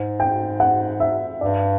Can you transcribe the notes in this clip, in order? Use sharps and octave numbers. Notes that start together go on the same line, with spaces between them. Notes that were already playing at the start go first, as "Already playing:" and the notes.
Already playing: G#2
G5
F#5
E5
G2 D5